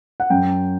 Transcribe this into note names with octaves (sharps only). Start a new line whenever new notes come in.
F#5
F#2 G5